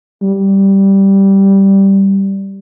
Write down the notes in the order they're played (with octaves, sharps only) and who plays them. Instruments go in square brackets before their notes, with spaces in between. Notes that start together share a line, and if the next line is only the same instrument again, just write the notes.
[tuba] G3